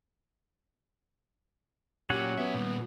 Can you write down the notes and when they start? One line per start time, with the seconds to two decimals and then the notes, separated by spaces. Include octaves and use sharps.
2.10 A#2 F#3 C#4 G4 F#5
2.38 B3 F#4 E5
2.55 A#2 G3